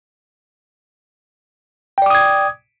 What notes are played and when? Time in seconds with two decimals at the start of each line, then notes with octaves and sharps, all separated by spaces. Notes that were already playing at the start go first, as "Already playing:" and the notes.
1.98 G5
2.02 D5
2.06 D6
2.10 D#6
2.15 G#6